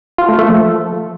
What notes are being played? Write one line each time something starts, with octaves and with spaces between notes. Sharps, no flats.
F4
A3
A3
F3